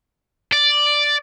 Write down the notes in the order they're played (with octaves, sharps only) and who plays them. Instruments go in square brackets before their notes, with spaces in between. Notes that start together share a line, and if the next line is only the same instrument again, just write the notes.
[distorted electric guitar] D5